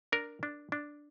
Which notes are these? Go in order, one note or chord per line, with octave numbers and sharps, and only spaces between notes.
D4 A#4
D4
D4